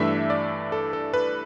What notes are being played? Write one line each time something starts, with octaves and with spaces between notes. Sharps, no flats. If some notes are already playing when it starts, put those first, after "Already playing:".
Already playing: G2 E3 A3 D4 E5
D5
A4
A4
B4